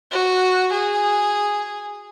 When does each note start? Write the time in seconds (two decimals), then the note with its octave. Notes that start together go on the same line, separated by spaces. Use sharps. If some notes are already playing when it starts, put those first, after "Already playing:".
0.12 F#4
0.73 G#4